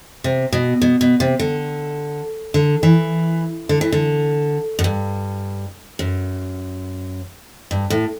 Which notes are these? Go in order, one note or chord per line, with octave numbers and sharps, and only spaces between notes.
C3
B2
B2
B2
C3
D3
D3
E3
D3
E3
D3
F#2
G2
F#2
G2
A2